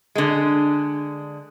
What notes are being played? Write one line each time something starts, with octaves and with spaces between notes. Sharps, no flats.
D3 G#3